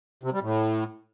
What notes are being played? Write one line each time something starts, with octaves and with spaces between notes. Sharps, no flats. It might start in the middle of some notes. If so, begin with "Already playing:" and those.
C3
G3
A2